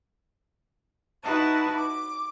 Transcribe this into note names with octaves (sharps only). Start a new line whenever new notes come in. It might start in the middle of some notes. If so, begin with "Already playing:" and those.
D#4 E4 F#4 B4 A5
D6